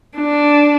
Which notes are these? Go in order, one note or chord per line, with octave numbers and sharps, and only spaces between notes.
D4